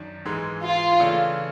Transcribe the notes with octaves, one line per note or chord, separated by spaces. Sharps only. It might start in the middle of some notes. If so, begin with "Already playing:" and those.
Already playing: F#2 D#3 D4
G#2 E3 G#3
F4
C#3 E3 A3 D4 F4